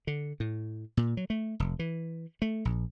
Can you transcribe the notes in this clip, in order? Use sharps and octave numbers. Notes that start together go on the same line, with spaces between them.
D3
A2
A#2
F#3
A3
F1
E3
A3
A#1